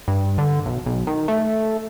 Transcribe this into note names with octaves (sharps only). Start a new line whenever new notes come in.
G2
D3
B1
B1
D#3
A3